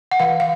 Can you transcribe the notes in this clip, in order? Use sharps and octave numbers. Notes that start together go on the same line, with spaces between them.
F#5
E3 F5
F5